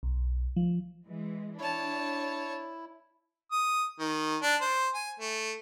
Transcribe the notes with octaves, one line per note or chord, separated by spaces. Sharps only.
B1
F3
E3 G#3
D4 E4 C#5 A5
D#6
D#3
D4
C5
G#5
A3